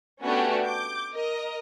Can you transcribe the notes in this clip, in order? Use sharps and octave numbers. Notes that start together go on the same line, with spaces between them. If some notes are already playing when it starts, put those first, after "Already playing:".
A3 B3 C#4 D4 F#4 G4
D6 G6
A#4 D#5